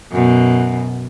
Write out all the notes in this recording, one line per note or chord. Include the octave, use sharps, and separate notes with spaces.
F#2 B2